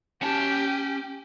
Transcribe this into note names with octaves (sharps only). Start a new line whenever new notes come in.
C#4 G4 A5